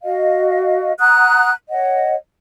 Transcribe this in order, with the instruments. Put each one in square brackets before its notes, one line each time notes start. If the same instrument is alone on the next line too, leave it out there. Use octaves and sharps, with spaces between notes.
[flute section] F#4 D#5 F5
F#5 A#5 D#6 F#6
C#5 D#5 F#5